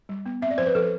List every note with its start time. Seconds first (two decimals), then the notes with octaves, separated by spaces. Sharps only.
0.09 G3
0.26 B3
0.42 C4 E5
0.51 D5
0.58 F3 C5
0.66 B4
0.75 F3 A4